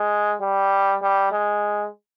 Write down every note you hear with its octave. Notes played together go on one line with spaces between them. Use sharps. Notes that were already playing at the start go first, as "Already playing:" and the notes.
Already playing: G#3
G3
G3
G#3